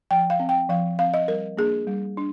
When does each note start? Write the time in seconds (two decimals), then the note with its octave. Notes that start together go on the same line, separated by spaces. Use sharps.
0.11 F3 G5
0.30 F5
0.40 C4
0.49 G5
0.69 F3 F5
0.99 C4 F5
1.14 D#5
1.28 G3 A#4
1.57 A#3 D4 G#4
1.87 G3
2.17 D4